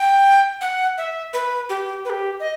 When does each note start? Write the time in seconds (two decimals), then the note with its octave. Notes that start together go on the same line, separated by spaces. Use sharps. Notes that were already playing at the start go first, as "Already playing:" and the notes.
Already playing: G5
0.61 F#5
0.98 E5
1.33 B4
1.69 G4
2.05 B4
2.10 G4
2.40 D#5